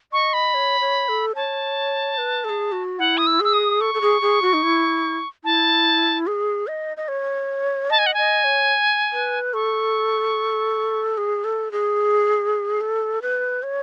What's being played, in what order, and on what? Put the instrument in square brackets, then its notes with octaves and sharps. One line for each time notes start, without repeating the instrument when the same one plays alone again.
[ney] D#5 [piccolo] C#6
[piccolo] B5
[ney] C#5
C#5
A4
[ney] C#5 [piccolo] A5
[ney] B4
A4
G#4
F#4
[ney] E4 [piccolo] F#5
[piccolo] D#6
E6
[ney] G#4 [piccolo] E6
[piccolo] D#6
[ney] A4 [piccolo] C#6
[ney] A4
G#4
G#4
F#4
D#4
E4
[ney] E4 [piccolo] A5
[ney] G#4
D#5
D#5
C#5
[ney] D#5 [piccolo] A5
[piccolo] G#5
F#5
[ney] D#5 [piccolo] G#5
[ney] C#5
B4
[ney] A4 [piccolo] C#6
[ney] G#4
A4
G#4
A4
B4
C#5